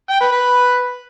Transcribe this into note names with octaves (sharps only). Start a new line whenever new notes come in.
G5
B4
B4